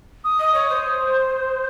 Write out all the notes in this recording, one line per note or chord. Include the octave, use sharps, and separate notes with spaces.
D#6
D#5
C#5
C5